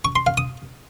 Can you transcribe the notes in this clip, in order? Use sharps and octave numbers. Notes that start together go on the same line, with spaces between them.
C#6
C6
F5
D#6